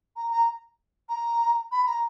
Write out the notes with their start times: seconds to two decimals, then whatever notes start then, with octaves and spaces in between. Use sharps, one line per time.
0.16 A#5
0.31 A#5
1.09 A#5
1.72 B5
1.87 A#5